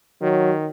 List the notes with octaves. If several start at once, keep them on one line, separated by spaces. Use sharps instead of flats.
D#3 F#3